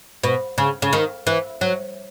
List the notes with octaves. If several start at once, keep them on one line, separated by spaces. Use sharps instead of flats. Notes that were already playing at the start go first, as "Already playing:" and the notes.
B2
C#3
C#3
D#3
E3
F#3